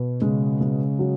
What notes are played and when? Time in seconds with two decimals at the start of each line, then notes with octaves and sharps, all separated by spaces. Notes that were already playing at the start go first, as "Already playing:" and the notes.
Already playing: B2
0.22 C#3 G#3
0.61 G#3
0.99 F#3